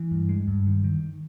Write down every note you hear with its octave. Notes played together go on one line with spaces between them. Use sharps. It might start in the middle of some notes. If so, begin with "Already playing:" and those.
Already playing: E3
G2
G#3
G2
D#3
D#3